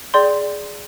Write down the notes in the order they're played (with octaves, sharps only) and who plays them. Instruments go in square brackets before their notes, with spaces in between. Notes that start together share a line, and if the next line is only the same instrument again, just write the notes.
[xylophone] G#4 D5 G5 C6 G6